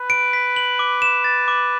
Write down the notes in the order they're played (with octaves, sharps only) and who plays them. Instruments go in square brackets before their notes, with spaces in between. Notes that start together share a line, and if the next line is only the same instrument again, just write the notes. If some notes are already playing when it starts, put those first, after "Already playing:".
Already playing: [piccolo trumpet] B4
[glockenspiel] D7
B6
F#7
D6
E7
A6
D6